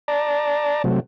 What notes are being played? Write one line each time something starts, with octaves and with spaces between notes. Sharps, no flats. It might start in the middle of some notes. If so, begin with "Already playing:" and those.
D5 A5 A#5
C3 F#3 A3